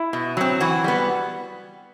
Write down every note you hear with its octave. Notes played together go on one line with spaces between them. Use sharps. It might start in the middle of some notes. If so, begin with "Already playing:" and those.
Already playing: E4
B2
F#3 C4
E3 F#4
G3 B3